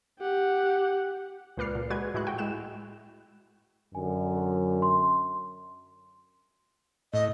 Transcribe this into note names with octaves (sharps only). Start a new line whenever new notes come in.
G4 F#5
C#2 A#2 B4 D5 F6 C7
A#2
G#3 F#4 B4 G#6
A2 G#3 E4 F#4 F#6
F#4 G5
G#3 E4 F#6 E7
F#2 D3 G#5
C6
A2 D#5